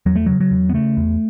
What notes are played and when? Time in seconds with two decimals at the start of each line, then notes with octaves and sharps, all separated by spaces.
0.06 E2 F#3
0.16 A3
0.26 C#3 F#3
0.40 F#3
0.51 E2
0.69 B3
0.74 C#3 A3
0.97 E2